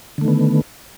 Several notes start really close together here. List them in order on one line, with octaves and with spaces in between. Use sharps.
D3 A3 D#3 B3